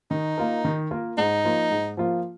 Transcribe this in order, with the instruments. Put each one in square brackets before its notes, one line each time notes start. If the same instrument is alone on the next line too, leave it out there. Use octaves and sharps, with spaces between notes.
[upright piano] D#3 [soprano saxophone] D#4
[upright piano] A#3 F4 A#4
D#3
A#3 F4 A#4
[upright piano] G#2 [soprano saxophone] D#4
[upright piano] F3 A#3 F4
G#2
F3 A#3 F4